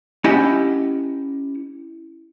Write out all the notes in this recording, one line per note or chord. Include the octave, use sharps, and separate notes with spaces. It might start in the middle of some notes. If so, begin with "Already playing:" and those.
C#4 E4 G4 D#5 F#5